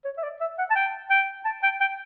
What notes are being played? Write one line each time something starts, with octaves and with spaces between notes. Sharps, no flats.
C#5
E5
D5
E5
F#5
A5
G5
G5
A5
G5
G5